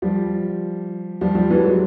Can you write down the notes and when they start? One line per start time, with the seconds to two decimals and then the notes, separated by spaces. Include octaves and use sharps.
0.02 F3 G3
1.21 F3 G3
1.35 F3 G3
1.50 E3 F#3
1.65 F#3 G#3